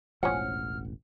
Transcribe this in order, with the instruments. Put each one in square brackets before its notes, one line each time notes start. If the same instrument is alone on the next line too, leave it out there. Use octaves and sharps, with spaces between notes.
[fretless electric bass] E1 A1 [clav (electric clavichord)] F3 C#4 [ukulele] F#5 [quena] F6